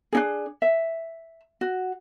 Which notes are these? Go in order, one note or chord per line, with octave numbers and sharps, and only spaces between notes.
D4 D#4 G#4
E5
F#4